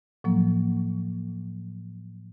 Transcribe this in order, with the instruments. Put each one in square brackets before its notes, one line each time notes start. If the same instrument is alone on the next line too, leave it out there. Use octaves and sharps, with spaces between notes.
[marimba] A2 F3 F#3 A#3